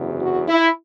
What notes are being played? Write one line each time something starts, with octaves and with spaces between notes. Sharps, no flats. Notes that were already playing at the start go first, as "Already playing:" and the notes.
Already playing: F#1 E2 C3 F#3
F#4
E4